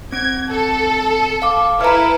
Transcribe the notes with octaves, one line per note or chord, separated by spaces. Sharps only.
C4 G#6 D7
A4
F5 D6
E4 A4 B4 A#5 F6